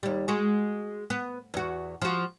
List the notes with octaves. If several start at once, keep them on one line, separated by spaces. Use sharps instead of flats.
D#2 G3
G#3 F#4
B3
E2 F#4
F3 F#4